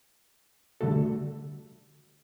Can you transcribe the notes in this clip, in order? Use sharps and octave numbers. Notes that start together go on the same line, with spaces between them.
D3 G3 A3 F#4 A4